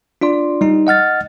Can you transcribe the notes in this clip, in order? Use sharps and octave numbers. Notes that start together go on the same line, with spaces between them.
D4 F4 D5 C6
G3 D#4
D#5 F#5 F6 A6